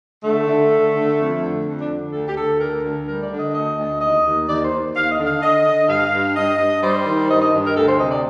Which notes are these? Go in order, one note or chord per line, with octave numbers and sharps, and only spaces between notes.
D3 A3
D3
D3
D3
F2
D3
F2
D4
D3
D2 A4
G4
D2 A4
D3 A#4
D2
G3 A#4
D5
D3
D#5
D2 D#5
D2
D#2 D#5
D#2
D#2 D5
C5
D#2
D#2 F5
D#5
D3
F5
D3 D#5
D3
G2 F5
G2
G2 D#5
G2
G3 C5
D#3
G2 D#5
D#5
G2
A#4
D2 A4
C5
C3 D#5
D5